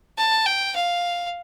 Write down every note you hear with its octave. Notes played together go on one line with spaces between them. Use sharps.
A5
G5
F5